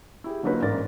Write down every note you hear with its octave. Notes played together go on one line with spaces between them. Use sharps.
E4 G4 G#4
D3 F#3 A#3 D#4 B4 C#5
A1 G#2 A#4 D5 A6